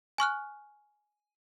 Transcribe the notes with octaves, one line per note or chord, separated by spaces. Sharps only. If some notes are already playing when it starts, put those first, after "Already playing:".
G#5 C#6 F6 F#6